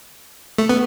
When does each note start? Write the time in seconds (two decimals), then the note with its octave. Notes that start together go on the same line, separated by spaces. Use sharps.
0.58 A3
0.69 B3